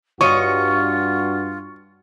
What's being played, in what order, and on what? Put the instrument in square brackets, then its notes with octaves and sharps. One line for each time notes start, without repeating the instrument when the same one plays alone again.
[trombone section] G2 F#4 [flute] F4 [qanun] C#5 D#5 [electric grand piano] C#6